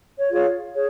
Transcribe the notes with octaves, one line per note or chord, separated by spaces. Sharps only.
C#5
F4 G#4 C#5
G#4 C#5